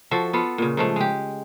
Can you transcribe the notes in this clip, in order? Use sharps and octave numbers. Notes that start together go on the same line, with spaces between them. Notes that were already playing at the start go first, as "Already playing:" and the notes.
F3 F#4 A4 E5
B3 F4 A4
A#2 C#3
G#2 F3 A3
G#3 G4